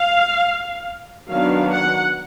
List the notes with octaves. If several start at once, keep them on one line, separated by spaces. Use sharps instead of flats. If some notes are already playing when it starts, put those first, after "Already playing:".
Already playing: F5
D#3 F#3 B3 D4 F5
F#5